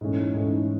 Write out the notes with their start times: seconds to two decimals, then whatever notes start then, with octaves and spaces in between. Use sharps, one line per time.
0.01 G#2 E3 A3 C#4
0.34 G#2 E3 A3 C#4